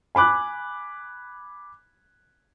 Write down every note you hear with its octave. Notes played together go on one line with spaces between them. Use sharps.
G#5 B5 D6 F#6